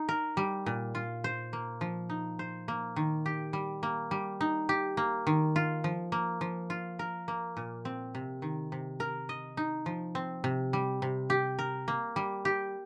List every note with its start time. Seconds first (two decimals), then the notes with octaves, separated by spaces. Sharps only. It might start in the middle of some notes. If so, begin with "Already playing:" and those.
Already playing: D#4
0.09 A#4
0.37 G3
0.66 A#2
0.95 F4
1.24 C5
1.53 A#3
1.81 F3
2.10 D#4
2.39 C5
2.68 A#3
2.96 D#3
3.26 G4
3.53 G3
3.83 A#3
4.11 G3
4.41 D#4
4.69 G4
4.97 A#3
5.27 D#3
5.56 F4
5.84 F3
6.12 A#3
6.41 F3
6.70 F4
6.99 A#4
7.28 A#3
7.57 A#2
7.85 C4
8.15 C3
8.42 D#3
8.72 C3
9.00 A#4
9.29 D#5
9.57 D#4
9.86 F3
10.15 C4
10.44 C3
10.73 G3
11.02 C3
11.30 G4
11.59 A#4
11.88 A#3
12.16 G3
12.45 G4